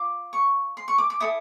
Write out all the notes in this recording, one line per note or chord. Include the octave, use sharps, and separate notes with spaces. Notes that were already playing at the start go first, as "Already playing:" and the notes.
Already playing: F4 D6
C#6
C6
C#6
D6
D6
E4 A4 D#6